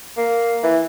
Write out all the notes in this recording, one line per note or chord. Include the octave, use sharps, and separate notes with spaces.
A#3
E3